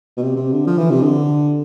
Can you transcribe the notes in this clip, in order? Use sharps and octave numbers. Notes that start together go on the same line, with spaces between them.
B2
C3
C3
D3
F3
E3
C3
D3